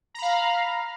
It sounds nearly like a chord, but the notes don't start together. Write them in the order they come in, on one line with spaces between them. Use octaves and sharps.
A#5 B5 F5